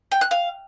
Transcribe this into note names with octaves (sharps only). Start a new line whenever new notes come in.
G5
F#6
F5